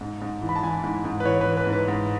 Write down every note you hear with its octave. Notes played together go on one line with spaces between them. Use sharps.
G#2
G#2
E3
B5
A5
E3 G#5
G#2
G#2
B4
E3 C#5
B4
E3
B4
G#2
B4
G#2